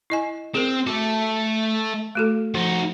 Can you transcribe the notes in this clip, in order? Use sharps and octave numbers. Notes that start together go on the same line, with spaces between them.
E4 D#5 G#5
C4 G#4 A#4
A3 F#4 A4
A3 F#4 A4
F3 D#4 F#4